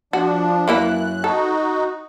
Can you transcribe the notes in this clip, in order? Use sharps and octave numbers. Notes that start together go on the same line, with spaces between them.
F3 D4 F#4
F#2 E3 A#3 E4 F#6
D#4 F#4 A4